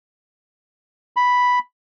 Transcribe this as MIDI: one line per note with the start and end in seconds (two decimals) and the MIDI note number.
1.16 1.59 83